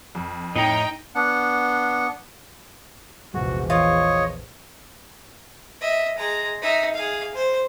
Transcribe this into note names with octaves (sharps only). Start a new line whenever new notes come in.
F2
A2 D#4 D#5 G5 A#5
B3 D4 F#5
A#1 E2 C3 F3 G#3 F#4
E3 F4 C#5 D#5
D#5 E5
G#3 A#5
D#4 E5
G#4 F5
C5